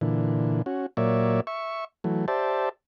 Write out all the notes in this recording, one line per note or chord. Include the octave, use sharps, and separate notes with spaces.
A#2 D3 E3
C#4 F#4
A#2 F#3 A#3 C#5 D5 E5
E5 C#6
E3 F#3 A3
G4 C5 D5 E5 A5